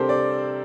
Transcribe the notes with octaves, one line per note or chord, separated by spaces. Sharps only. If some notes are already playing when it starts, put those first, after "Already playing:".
Already playing: C3 G3 C4 D4 G4 A4 A#4 C5
D5